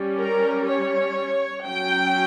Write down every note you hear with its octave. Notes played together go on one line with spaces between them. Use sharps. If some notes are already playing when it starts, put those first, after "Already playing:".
Already playing: G3 C#4
A#4
C#5
F#3 C#4 G5